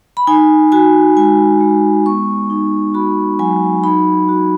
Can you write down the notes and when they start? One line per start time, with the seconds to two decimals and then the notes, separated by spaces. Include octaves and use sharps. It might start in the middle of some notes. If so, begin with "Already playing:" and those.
0.17 B5
0.27 D#4 G#5
0.72 F#4 G#5
1.17 G#3 G#5
1.60 G#3
2.05 B3 C#6
2.50 D#4
2.94 F#4 B5
3.39 F#3 G#5
3.84 D#4 B5
4.29 F#4